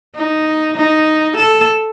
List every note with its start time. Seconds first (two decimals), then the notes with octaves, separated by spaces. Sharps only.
0.15 D#4
0.77 D#4
1.37 A4